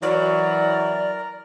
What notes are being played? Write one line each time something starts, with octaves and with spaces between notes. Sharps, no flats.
E3 F#3 A#4 D5